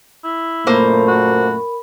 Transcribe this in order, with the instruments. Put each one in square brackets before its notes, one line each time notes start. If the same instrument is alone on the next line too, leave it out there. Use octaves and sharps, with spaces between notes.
[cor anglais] E4
[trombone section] F#2 A#2 A3 [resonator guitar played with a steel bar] A#3 C5 [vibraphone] A#4 B5
[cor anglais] F#4